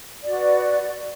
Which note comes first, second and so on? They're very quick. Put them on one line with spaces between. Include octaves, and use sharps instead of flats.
D5 F#4 B4